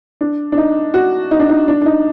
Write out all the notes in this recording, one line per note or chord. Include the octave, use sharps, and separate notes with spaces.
D4
D4
D#4
F#4
D#4
D4
D#4
D4
D4
D#4